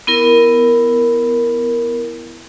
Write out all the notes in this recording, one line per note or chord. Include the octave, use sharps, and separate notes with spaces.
B3 E4 A#4